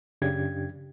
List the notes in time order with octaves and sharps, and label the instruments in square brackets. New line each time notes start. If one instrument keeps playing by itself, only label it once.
[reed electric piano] F#2 C#3 D4 G4 G#6